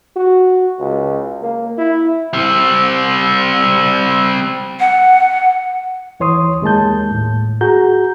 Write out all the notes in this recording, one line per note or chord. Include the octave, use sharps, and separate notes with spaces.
F#4
C#2
A#3
E4
G3 C4
F#5
D#2 E3 C#5 C6 D#6
D#2 G#3 A#3 A5 G6
A2
F#4 G#4 A#5 G6